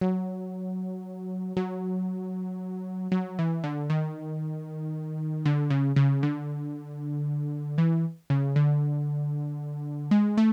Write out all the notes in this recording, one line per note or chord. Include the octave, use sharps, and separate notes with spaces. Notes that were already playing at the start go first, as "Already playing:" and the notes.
F#3
F#3
F#3
E3
D3
D#3
D3
C#3
C#3
D3
E3
C#3
D3
G#3
A3